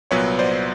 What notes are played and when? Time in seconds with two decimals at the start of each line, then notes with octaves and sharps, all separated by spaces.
0.11 C2 A#2 F#3 B3 B4 C#5
0.39 C5 D5